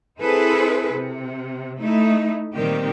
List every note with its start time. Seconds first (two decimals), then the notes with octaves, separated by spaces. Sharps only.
0.19 C4 E4 G#4 A4 B4 C5
0.93 C3
1.79 A3 D#4 E4
2.54 A#2 D#3 G3 C4 G4